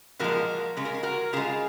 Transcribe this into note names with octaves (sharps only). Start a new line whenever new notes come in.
A#2 F3 G#3 F#4 A#4
C#3 G#3
A#4
G#4
F#4 A#4
C#3 G#3 F4 G#4